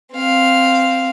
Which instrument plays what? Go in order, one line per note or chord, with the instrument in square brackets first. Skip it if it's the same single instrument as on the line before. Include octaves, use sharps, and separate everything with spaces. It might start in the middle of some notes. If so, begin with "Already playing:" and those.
[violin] C4 F5